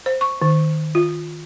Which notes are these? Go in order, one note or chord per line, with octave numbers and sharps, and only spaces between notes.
C5
C#6
D#3
F4